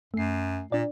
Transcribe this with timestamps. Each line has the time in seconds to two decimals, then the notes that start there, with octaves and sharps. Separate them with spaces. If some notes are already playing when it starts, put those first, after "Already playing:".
0.14 F#2 A3 C7
0.72 A#2 D4 D5